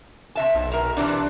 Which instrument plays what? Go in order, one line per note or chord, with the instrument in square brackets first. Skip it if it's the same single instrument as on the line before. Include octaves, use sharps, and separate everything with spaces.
[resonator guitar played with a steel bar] C3 E5 A5
[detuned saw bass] B1
[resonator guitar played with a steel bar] A#4 A#5
[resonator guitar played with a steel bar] C3 E3 [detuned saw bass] D4